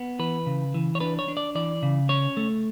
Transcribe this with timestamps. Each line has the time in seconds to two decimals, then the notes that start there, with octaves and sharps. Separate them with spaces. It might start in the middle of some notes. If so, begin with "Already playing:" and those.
Already playing: B3
0.19 E3 B4
0.46 C#3
0.74 E3
0.95 C#5
1.00 D4 B4
1.19 C#5
1.28 D4
1.37 D5
1.55 E3 D5
1.83 C#3
2.09 C#4 C#5
2.37 A3